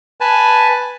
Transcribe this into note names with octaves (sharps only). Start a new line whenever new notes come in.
B4 G#5 A5